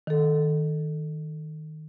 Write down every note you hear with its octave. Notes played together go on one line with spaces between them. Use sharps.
D#3 A4